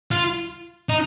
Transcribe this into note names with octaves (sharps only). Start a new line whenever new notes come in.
F4
D#4